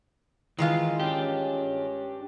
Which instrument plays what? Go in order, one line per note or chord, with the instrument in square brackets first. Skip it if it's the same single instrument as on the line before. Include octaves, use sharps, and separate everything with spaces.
[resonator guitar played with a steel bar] D#3 G#3 F4 [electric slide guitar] E3
[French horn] C#4 [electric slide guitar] D4 G4